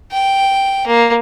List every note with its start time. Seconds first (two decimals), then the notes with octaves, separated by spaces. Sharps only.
0.12 G5
0.87 A#3